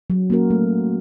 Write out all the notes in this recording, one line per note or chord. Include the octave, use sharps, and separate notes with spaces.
F#3
A#3 C#4 F#4 A#4
A3